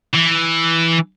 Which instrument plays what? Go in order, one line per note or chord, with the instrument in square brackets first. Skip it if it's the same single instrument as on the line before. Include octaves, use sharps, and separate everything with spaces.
[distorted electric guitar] E3